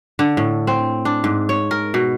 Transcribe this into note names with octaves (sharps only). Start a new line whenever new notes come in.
D3
A2
C4
D4
G#2
C#5
A#4
B2